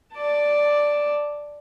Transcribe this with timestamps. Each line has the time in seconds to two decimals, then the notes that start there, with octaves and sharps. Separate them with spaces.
0.14 D5 A5